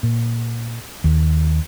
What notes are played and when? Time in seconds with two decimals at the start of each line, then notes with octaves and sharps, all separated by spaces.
0.03 A#2
1.04 D#2